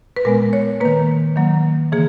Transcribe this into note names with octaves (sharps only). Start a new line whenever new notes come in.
B4
A#2 G#3 B3 A#4
C#5
D#3 A#3 B4
D#3 F#3 A#3
C#3 E3 A#3 G#4